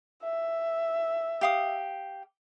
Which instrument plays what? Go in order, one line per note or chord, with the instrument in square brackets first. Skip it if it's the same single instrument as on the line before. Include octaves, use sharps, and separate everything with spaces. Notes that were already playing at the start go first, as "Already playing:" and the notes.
[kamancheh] E5
[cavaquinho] G4 F5 D#6